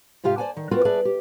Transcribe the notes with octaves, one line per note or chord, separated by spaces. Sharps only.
G#2 C3 F4 G4 F5
C5 D5 F#5 G#5 A5
D#3
B3 C4 F4 F#4 A#4 B4
G#4 B4 D5 E5 A5
G4